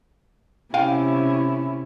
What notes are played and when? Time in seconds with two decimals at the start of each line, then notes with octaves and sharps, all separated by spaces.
0.74 C3 C#4 E4 F5 G5 G#5